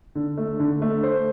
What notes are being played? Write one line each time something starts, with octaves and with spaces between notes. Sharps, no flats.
D3
A3
D3
A3
C5